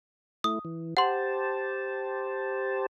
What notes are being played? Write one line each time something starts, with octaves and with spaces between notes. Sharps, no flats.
A3 E4 D#6
E3
G4 C5 F#5 A5 C6